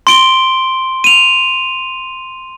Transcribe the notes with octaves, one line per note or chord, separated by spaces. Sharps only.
C6 D7 G7
D#7 F7